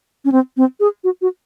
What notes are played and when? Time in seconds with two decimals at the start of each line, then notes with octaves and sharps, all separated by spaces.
0.25 C#4
0.32 C4
0.57 C4
0.80 G#4
1.04 F#4
1.22 F#4